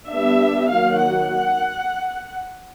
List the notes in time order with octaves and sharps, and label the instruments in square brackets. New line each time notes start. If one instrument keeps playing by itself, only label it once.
[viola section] G3 B3 D4 E5
D#3 F#3 A#3 F5
F#5